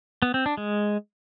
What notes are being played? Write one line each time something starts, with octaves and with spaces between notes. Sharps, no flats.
B3
C4
D4
G#3